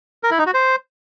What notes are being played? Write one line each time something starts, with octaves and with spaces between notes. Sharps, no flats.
A#4
E4
D#4
F#4
C5